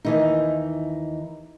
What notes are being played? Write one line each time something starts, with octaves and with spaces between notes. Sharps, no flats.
D#2 E3 D#4